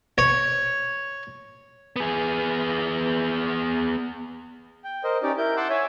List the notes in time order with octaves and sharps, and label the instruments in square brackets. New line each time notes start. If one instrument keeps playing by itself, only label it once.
[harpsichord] C#5
[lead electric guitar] B3 G#4
[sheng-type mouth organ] G5
A#4 C5 D#5
C#4 D#4 G4 D5
E4 A#4 G6
F#5 A5 C6 D6 E6 F#6
C#5 E5 G#5